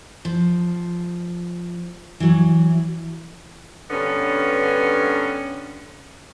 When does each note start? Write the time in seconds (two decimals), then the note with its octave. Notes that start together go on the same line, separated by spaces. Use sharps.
0.25 F3
2.20 E3 F#3
3.90 G2 D3 B3 C#4